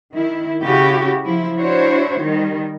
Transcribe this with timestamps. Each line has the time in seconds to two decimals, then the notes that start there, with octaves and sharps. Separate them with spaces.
0.13 D#3 E4
0.64 C#3 E4 F#4 G4
1.25 F3 E4
1.58 D4 E4 F#4 C5 C#5
2.20 D#3 G3